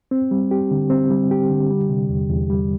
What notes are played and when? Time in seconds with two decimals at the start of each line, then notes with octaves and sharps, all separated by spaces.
0.11 C4
0.31 G3
0.51 G4
0.71 D3
0.90 C4
1.11 G3
1.31 G4
1.50 D3
1.71 G3
1.89 C3
2.09 E2
2.30 E2
2.50 G3